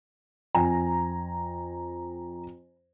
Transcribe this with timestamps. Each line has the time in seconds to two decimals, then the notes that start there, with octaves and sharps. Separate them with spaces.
0.55 F2 G#5 A#5